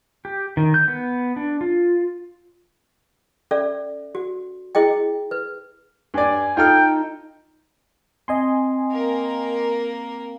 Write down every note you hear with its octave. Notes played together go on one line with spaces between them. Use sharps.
G4
D#3
G6
B3
D4
F4
C#4 A4 D5 E5
F#4
E4 G#4 D#5 G5
B4
G2 D5 G#5
D#4 F4 A4 G5 F6
C4 D#5 G#5 C6
A#3 A#4